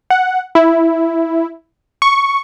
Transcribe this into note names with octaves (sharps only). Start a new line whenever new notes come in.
F#5
E4
C#6